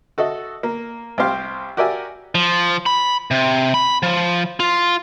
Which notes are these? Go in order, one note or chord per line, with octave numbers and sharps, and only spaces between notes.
F#4 A4 D#5 E5
A#3
C2 C4 G4 C5 F5
F#4 G4 A#4 D5 E5 G#5
F3
B5
C3
B5
F3
F4